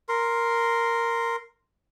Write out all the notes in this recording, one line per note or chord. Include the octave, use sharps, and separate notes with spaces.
A#4 C6